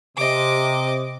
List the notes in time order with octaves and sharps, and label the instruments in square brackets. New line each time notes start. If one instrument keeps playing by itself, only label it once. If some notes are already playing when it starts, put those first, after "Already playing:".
[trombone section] C3 [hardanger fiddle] D#5 D6